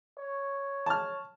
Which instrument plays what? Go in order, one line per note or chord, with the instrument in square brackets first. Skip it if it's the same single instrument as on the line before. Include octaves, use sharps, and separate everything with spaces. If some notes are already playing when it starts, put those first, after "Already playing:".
[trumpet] C#5
[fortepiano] A5 F6